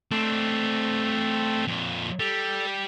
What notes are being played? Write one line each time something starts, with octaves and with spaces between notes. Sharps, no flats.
A3 C4 D4
F2 A#2
G3 A4